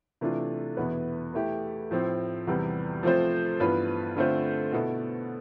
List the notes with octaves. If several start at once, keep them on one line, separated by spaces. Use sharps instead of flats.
C3 E3 A3 D4 F4
E2 B2 B3 E4 B4
E3 A3 E4 G4
A2 F3 C4
E2 C3 G3 B3
F3 A3 C4 F4 C5
G2 E3 B3 F4 B4
D3 A3 C4 F4 C5
B2 B3 E4 A4